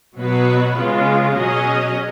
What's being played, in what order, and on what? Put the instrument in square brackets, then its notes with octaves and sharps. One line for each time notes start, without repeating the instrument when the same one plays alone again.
[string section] B2 F#3 B3 F#4 B4
C#3 G#3 B3 F4
B2 F#3 C#4 G#4 D#5